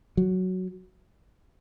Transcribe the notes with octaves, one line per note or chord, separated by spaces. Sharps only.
F#3